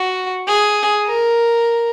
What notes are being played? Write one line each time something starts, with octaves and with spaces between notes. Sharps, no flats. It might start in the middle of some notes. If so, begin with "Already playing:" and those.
Already playing: F#4
G#4
A#4